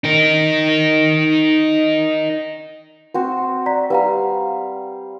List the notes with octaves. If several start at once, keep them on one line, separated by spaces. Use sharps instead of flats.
D#4 A#4
C4 F#4 C5
D5 A#5 B6
G3 B4 F5 F#5 A#5